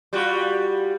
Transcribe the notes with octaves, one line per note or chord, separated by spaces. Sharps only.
G3 F4 F#4